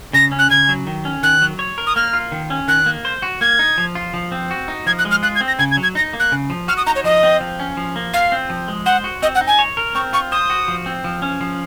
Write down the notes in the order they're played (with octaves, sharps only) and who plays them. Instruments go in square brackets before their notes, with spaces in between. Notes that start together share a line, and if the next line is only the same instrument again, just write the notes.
[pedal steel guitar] C#3 [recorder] A#6
[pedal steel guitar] C#4
[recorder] F#6
[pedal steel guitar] C#3 [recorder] G#6
[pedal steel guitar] F#3
D#3
C#4
[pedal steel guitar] D#3 [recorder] F#6
[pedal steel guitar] F#3
C#5
A#4
[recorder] D#6
[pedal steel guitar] A#3 [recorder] F6
[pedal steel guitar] F4
D#3
C#4
[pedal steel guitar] D#3 [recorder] F#6
[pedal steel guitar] A#3
C5
F#4
[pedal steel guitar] A#3 [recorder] G#6
[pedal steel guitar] D#4
F3
F4
F3
C4
F#4
D#4
[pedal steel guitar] F3 [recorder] G#6
[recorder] F#6
[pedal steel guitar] G#3
[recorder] F6
[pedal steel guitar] F4 [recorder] F#6
[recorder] G#6
[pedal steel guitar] C4
[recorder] A#6
[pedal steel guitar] C#3 [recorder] G#6
[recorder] G#6
[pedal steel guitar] F#3
[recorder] G#6
[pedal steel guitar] D#4 [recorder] A#6
[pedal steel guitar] A#3
[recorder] F#6
[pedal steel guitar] C#3
F3
[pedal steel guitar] F#4 [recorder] F6
[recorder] D#6
[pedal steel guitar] D#4 [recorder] A#5
[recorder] C#5
[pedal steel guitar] F3 [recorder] D#5
[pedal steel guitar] C4
F3
C#4
F3
A#3
[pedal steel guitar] F4 [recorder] F5
[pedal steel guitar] C4
F3
G#3
[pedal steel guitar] C5 [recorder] F#5
[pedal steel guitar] F#4
[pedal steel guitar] C4 [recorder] D#5
[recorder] F#5
[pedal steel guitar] D#4
[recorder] G#5
[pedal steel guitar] C#5
A#4
[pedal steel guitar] C4 [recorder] C#6
[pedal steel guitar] F4 [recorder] C#6
[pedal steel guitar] C5 [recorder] D#6
[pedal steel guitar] F#4
F3
C4
F3
C#4
F3